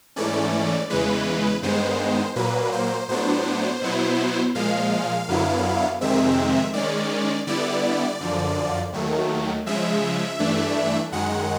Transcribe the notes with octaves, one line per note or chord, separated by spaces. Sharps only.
G#2 E3 A3 C#4 D5
E2 C#3 E3 G#3 B4
G2 D#3 G#3 B3 C5
A#2 F#3 A#3 B4
C5
A2 F#3 B3 D4 C5
B2 F#3 B3 E4
A#2 F3 G#3 F5
F#2 D3 F#3 B3 E4
F2 C3 D#3 G#3 C4 E5
D#3 G#3 C#4 D5
D3 G3 B3 E4 D5
F#2 D3 F3
D#2 D#3 F#3 A3
C#3 F3 G#3 E5
G2 E3 A3 D4
F#2 D#3 G#3 F#5